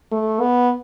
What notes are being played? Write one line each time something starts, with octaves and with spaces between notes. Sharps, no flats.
A3
B3